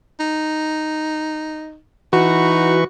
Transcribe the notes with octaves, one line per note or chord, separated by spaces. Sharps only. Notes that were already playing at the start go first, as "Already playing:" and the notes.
D#4
E3 D#4 F#4 B4 C#6